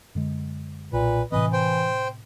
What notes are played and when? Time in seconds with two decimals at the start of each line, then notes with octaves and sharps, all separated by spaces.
0.15 F#2 D3 G#3
0.93 B1 A#2 B4
1.32 A2 C3 E3 C4 B4 D#5
1.53 C5 G5